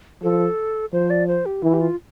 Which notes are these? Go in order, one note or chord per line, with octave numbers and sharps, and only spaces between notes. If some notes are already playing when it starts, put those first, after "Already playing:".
F3 A4
F3 C5
D5
C5
G4
E3 E4
G4
F4